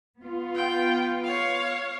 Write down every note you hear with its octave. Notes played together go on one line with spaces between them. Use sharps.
B3 F4
G5
C#5 F5